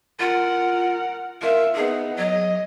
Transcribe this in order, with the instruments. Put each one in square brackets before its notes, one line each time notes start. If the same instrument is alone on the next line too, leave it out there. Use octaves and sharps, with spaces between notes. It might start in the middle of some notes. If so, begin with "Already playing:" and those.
[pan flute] F4 [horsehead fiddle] A#4 F#5
[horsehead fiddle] F4 E5 [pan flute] A#4
[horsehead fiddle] B3 D#4 [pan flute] G#4
[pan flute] F#3 [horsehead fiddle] D#5